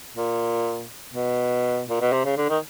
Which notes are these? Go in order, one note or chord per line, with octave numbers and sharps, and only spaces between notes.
A#2
B2
A#2
B2
C3
C#3
D3
D#3